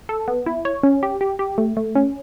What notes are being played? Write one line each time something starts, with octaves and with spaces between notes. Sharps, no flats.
A4
B3
E4
C#5
C#4
G4
G4
G4
A3
A3
C#4